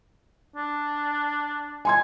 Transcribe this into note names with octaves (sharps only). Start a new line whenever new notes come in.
D4
G#5 C6 G#6